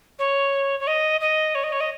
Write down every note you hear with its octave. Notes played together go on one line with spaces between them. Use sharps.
C#5
C#5
D#5
D#5
C#5
D#5
C#5
D#5